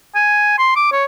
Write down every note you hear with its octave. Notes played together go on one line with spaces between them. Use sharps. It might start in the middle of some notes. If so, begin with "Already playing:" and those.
G#5
C6
D6
C#5